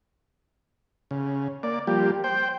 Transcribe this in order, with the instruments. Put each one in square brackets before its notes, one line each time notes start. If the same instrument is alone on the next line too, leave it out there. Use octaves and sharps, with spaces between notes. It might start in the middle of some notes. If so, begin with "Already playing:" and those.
[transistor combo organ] C#3
A#3 D5
F3 G3 A#3 G4
C5 G5